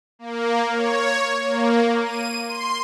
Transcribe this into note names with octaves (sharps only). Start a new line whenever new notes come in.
A#3
C#5
A#3
D#7
C6